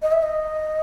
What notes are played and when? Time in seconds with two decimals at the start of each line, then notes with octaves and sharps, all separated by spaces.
0.02 D#5
0.12 E5
0.23 D#5